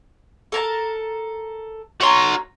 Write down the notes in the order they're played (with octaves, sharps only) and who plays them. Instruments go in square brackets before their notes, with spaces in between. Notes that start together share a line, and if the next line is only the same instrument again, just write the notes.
[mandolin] A4 A#4 A5
[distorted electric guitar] F#4 C6 [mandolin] A#4 C#5 A#5